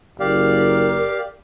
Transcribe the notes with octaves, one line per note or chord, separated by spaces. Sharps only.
F#1 G4 A#4 D5 F5